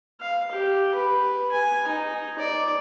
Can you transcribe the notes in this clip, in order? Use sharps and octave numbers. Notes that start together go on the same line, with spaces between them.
F5
G4
B4
G#5
D#4
D5